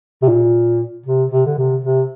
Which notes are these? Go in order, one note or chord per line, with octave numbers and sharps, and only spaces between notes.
C3
A#2
C3
C3
D3
C3
C3